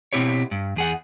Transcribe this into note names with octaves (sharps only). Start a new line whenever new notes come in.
B2 F3 C4 E4 G4 C#5
G2
E2 G#4 F#5